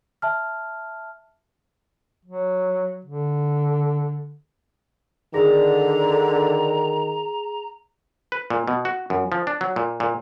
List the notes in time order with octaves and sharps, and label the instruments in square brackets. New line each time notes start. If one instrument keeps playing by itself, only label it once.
[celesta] E5 A5 F6
[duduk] F#3
D3
[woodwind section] D3 [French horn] D#3 [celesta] G#4 A#6 [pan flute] A#5
[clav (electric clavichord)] B4
A#2
B2
F#4
F#2
F3
D4
F#3
A#2
A#2